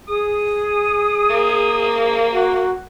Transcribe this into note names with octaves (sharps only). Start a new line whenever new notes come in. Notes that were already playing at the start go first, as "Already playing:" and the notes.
G#4 D#6
A#3
F#4